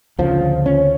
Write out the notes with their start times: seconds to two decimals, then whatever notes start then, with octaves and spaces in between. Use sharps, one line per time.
0.19 D2 C#3 F3
0.66 C#4